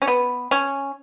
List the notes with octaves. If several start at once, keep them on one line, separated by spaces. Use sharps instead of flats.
C#4
B3
C#4